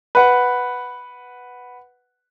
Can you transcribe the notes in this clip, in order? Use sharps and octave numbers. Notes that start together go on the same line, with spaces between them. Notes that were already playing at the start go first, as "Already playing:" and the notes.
B4 F#5